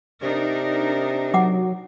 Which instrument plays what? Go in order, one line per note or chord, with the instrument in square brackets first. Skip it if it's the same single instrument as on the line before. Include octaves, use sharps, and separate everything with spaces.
[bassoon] C3 [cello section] D4 D#4 A#4
[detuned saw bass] F#3 [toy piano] F#5 D6